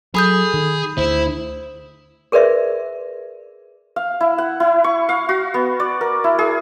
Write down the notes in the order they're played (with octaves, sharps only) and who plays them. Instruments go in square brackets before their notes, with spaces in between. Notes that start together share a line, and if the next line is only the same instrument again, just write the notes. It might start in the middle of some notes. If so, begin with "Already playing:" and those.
[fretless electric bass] F#3 [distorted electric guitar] G#4 [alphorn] A4 [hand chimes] B5 D#6 G6
[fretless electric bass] D#3
[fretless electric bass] D2 [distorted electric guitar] E4 [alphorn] C5
[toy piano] G#4 A#4 B4 D5 E5
[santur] F5
E4
F#5
E4
C#6
F5
F#4
B3
D5
A#4
E4
G#4